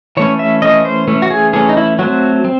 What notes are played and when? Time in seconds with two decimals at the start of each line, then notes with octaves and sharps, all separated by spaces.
0.17 E3 A3 C#4 C#5
0.39 E5
0.62 E3 A3 C#4 D#5
0.85 C5
1.08 E3 A3 C#4
1.22 F#4
1.30 G#4
1.53 E3 A3 C#4 G#4
1.69 D#4
1.77 E4
1.99 F#3 A3 C4 F#4
2.45 C4